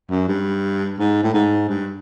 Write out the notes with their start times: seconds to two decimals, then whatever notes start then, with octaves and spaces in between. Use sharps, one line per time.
0.11 F#2
0.28 G2
0.99 G#2
1.24 A2
1.34 G#2
1.69 G2